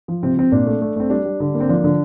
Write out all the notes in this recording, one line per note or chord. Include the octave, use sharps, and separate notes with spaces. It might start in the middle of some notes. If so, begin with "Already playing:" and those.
F3
C3 C4
C3 C4
A#2 D4
A3
A3
A3 C4
G3 D4
G3
D3
A#3
C4
F3 D4
D3